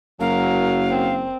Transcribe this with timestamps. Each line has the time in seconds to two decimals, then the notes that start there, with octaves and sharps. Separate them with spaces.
0.20 F#1 F#3 A#4 F5
0.89 C4